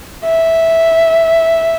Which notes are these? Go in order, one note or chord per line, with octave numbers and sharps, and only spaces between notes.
E5